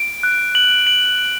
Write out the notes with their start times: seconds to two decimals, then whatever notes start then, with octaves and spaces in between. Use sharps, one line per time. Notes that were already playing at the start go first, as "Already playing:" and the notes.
Already playing: D7
0.23 F#6
0.55 F#7
0.87 F#7
1.18 F#7